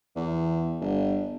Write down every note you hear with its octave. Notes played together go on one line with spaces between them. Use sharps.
E2
G1